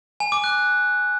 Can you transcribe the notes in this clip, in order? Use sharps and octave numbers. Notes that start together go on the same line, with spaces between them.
G#5
D6
F#6